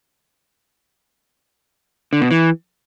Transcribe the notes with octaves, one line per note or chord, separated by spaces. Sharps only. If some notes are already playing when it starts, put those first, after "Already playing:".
D3
B2
E3